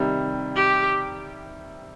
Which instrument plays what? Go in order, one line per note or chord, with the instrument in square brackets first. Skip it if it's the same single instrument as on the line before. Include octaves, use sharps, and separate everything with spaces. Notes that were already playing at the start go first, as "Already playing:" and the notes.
Already playing: [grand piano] C3 D#3 G3
[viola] G4